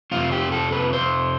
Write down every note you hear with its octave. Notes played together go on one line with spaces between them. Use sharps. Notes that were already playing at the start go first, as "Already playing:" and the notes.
F2 C3 F3 F4
G4
A4
B4
C5